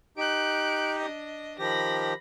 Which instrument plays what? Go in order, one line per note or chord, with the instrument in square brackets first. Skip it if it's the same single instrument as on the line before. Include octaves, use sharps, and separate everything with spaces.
[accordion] D#4 G4 [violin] F#6 D7
[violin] D4 D#5
[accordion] D#3 F3 G4 [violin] B5 A#6